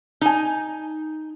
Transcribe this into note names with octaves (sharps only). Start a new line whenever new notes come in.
D#4 G#5